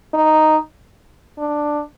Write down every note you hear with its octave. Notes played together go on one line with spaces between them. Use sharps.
D#4
D4